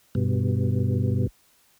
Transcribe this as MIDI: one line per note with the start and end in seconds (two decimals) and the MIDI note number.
0.15 1.27 43
0.15 1.27 47